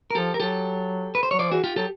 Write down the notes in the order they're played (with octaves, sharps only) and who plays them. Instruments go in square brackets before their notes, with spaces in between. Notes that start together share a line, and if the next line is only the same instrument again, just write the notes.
[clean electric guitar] A#4
[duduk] F3 [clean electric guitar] G4 A4
[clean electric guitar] A#4
[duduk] F#3 [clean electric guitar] G4 A4
[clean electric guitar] B4
C5
[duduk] F#3 [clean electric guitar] C#5
[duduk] F3 [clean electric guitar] C5 D5
[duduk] E3 [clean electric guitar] F#4 G#4
[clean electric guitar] F4 G4
[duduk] F#3 [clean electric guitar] G4 A4